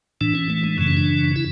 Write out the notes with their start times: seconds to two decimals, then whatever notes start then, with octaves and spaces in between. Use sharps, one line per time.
0.21 A2 E3 D4
0.35 C#4
0.50 A3
0.64 G#3
0.78 F#2 C#3 E3 A3
0.88 C#4
0.97 D4
1.36 E4